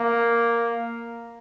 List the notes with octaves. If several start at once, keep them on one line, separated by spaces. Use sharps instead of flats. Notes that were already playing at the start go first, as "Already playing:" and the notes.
Already playing: A#3